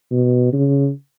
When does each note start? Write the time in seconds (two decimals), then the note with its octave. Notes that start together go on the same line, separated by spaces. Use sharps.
0.11 B2
0.53 C#3